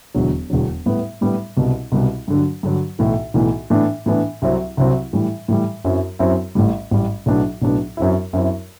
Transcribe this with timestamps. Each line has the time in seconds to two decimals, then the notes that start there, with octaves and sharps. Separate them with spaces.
0.14 E1 E2 D3 F#3
0.50 E1 E2 D3 F#3
0.86 A2 G3 B3
1.21 A2 G3 B3
1.57 C2 B2 G3
1.92 C2 B2 G3
2.28 G2 D3 F#3
2.63 G2 D3 F#3
2.99 B1 A2 E3
3.34 B1 A2 E3
3.70 A2 E3 B3 D4
4.06 A2 E3 B3 D4
4.42 C2 C3 F#3 C4 E4
4.77 C2 C3 F#3 C4 E4
5.13 A2 E3 G3
5.48 A2 E3 G3
5.85 F#2 F#3 C4 E4
6.19 F#2 F#3 C4 E4
6.55 A1 A2 G3
6.91 A1 A2 G3
7.26 B1 A2 F#3 B3 D4
7.62 B1 A2 F#3 B3 D4
7.97 F#2 F#3 C4 E4
8.33 F#2 F#3 C4 E4